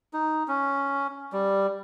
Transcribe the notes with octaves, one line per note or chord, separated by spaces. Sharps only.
D#4
C#4
G3